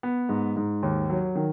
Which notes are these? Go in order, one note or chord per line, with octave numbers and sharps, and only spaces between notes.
B3
G#2
G#2
D#2
F#3
D#3